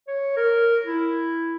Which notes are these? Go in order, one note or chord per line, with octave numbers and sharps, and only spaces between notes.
C#5
A#4
E4